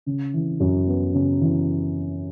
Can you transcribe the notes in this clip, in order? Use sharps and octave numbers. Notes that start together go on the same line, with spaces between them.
C#3
E3
F#2
B3
C#3
E3